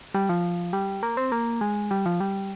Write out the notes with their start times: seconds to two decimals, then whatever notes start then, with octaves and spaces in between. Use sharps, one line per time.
0.15 G3
0.29 F3
0.73 G3
1.03 A#3
1.17 C4
1.32 A#3
1.61 G#3
1.91 G3
2.06 F3
2.20 G3